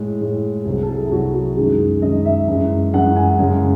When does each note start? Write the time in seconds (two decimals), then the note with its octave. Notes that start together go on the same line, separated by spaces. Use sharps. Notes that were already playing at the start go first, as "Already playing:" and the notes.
Already playing: A2 G#3
0.21 A2 G#3
0.65 C2 C3 F#3 G#4
0.83 A4
0.89 G#4
1.05 E4
1.11 C2 C3 F#3 F#4
1.34 F#4
1.57 F#2 D#3 G#3 G#4
2.02 F#2 D#3 G#3 D#5
2.25 E5
2.48 F#2 E3 G#3
2.93 F#2 E3 G#3 F#5
3.16 G#5
3.39 F#2 C#3 G#3